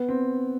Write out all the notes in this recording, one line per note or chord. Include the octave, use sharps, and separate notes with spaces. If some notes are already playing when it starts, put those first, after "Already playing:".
Already playing: B3
C4